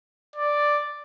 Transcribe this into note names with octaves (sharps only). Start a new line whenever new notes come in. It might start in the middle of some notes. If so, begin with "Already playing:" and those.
D5